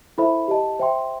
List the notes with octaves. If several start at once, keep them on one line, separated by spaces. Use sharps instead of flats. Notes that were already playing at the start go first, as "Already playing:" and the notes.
E4 A4 C5 E5 B5
G4 D#5 A5
C5 E5 G5 C6